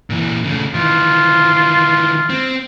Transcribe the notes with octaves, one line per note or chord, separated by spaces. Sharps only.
A#2 E3
C#3 A3
D#3 E3 F4
C4